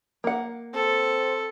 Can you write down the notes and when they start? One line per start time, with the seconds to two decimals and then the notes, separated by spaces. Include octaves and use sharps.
0.24 A#3 F#5
0.75 C4 A4